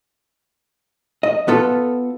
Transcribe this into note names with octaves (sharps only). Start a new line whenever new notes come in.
D#5
B3 F4 A4